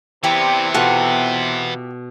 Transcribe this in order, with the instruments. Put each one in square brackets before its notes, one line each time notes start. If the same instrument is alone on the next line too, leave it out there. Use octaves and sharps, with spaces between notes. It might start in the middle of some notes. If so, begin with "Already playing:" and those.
[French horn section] C3 [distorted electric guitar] E3 B3 [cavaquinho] E4 G4 D5
[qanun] B2 A4 C#6 [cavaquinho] F4 G4 F#5